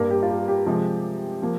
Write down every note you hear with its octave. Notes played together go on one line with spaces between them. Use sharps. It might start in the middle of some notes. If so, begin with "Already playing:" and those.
Already playing: G2 G3 A#3 A#4
G4
F4
G4
G4
C3 F3 G#3
F3 A#3